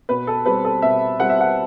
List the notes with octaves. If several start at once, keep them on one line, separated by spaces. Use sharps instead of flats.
B2 B4
A4
G3 C4 B4
A4
B2 E5
G3 C4 F#5
E5
F#5